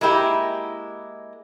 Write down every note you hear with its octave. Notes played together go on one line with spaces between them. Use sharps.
G#3 A#3 E4 G4